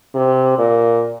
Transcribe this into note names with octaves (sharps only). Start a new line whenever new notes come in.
C3
A#2